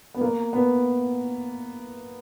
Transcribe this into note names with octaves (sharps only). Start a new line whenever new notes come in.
B3
A#3
B3